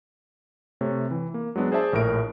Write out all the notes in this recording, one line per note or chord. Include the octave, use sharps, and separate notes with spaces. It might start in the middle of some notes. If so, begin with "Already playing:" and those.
C3 A3 C#5
E3
A#3
F#3 G#3 B3 D4
G#4 C5 D5 E5 A5
A#1 A2 A#4 D7